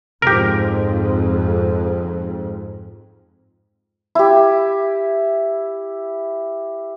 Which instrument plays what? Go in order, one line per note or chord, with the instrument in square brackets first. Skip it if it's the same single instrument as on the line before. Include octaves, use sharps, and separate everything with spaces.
[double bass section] F2 G#2 [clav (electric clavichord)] G4 A#4
[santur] E4 G4